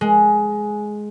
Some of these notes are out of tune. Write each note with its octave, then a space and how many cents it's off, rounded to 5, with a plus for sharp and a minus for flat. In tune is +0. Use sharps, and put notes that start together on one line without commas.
G#3 +10